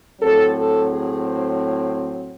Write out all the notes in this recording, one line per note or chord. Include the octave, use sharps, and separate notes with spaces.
A2 F#3 C4 A4
A4
G#4
C5